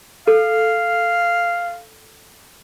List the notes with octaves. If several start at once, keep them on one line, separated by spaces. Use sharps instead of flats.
A4 F5